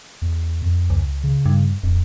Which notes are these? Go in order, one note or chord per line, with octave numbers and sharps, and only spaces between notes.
E2
F2
C#2
C#3
G2
D1 F2